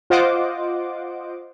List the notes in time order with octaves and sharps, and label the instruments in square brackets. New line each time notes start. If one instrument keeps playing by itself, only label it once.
[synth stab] F4 C5 D#5 F#5 D6